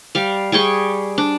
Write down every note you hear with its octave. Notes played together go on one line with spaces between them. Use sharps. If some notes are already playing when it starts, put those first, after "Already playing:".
G3 F5
G3 G#4 G5 C#6
D4